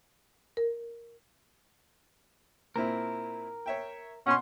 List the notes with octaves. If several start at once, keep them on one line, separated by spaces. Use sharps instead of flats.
A#4
A#2 C4 E4 A#4
C#5 E5 G5
B2 C#4 F#5 C6